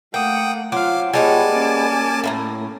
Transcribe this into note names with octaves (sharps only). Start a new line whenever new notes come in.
A3 A#3 F#5 G5 D#6
F#3 C4 F4 F5 D6
G3 G#3 B3 F4 C#5 G#5 A5 D6
A#3 C#4
A2 E4 A#5